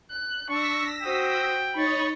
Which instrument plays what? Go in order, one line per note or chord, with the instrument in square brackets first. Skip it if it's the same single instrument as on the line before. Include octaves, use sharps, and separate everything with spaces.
[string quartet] F#6
[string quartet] D4 [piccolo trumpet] C#6 [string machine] E6 A#6 B6
[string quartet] F#4 C5 D#6 [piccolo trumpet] G5
[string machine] D#4 C#5 D#5 [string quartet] B5 C#6 A6